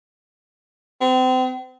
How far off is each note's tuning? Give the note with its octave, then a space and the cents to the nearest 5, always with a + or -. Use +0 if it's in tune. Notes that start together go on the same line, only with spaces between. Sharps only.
C4 -35